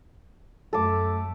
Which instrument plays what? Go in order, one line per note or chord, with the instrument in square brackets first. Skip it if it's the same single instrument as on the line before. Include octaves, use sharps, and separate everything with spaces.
[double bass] F#2 A3 [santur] A4 D6